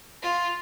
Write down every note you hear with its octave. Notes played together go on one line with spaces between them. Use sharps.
F4